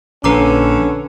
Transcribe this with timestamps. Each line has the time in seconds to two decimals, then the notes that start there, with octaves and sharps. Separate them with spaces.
0.24 A#1 D3 C#4 B4 A#5 D6